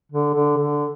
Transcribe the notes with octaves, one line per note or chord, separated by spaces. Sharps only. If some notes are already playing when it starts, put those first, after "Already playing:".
D3
D3
D3